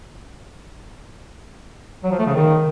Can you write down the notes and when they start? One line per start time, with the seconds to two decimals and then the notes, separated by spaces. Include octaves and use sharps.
2.04 F#3
2.11 F3
2.19 A3
2.26 C#3
2.34 D#3